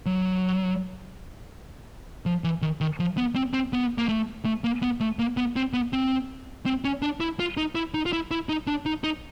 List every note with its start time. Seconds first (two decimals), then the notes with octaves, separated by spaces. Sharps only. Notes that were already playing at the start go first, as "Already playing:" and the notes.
0.06 F#3
2.26 F3
2.44 E3
2.62 D#3
2.81 D#3
3.00 F3
3.17 B3
3.35 C4
3.53 C4
3.73 B3
3.98 A#3
4.09 A3
4.45 A3
4.64 A#3
4.82 B3
5.00 A3
5.19 A#3
5.37 B3
5.56 C4
5.73 B3
5.93 C4
6.66 C4
6.85 C#4
7.02 D4
7.20 E4
7.40 F4
7.57 D#4
7.75 E4
7.94 D#4
8.06 F4
8.13 E4
8.31 E4
8.49 D#4
8.67 D4
8.86 D#4
9.04 D#4